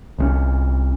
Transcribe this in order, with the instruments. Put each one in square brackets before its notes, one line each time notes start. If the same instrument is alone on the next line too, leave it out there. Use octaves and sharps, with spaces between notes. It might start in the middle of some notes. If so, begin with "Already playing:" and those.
[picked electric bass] C2 G#3 C#4